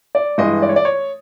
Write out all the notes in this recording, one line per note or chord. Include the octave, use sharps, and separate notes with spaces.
D5
G2 E3 G#3 D#5
D5
C#5
D5
C#5